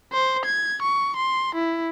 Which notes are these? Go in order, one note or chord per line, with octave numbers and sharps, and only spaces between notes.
C5
G#6
C#6
C6
E4